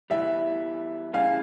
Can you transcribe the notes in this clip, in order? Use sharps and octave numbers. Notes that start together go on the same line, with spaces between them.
E2 E3 G3 E5
C#3 G3 C#4 E4 G#4 F5